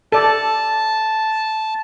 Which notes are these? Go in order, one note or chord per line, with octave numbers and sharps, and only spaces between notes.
A4 D5 A5